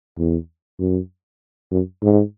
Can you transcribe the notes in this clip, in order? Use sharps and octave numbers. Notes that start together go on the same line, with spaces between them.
E2
F#2
F#2
G#2